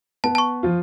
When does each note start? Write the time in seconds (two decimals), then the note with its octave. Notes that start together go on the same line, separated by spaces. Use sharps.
0.24 B3 A5
0.35 A5 C#6
0.63 F3 F4